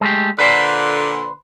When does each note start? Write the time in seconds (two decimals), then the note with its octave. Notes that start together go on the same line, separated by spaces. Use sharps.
0.01 G#3 A3 G4
0.39 A#2 D3 B4 C5